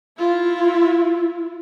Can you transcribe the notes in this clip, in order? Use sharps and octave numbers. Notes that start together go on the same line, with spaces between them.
E4 F4